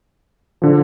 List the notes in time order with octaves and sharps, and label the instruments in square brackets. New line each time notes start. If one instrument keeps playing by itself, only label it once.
[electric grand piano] D3 F3